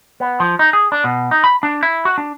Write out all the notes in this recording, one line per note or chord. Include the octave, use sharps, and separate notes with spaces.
B3
F3
D#4
G#4
D4
B2
D#4
B5
D4
E4
F#4
D4